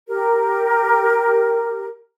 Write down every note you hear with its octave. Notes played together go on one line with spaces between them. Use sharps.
G4 A#4